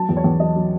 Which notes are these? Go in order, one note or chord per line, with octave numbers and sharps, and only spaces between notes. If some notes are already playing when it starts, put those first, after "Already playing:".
Already playing: F#3 A5
E2
C#5
E2
F#3 D#5
F#3